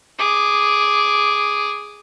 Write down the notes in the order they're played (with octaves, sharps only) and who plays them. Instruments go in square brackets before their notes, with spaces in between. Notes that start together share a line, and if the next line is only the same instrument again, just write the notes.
[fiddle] G#4 D6